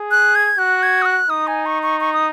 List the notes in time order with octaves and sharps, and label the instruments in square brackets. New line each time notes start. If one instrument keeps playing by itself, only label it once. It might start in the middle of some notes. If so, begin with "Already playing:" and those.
Already playing: [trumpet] G#4
[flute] F#6
G#6
[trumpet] F#4 [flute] F#6
[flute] G#6
D#6
F#6
[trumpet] D#4 [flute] D#6
[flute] G#5
C#6
C#6
C#6
D#6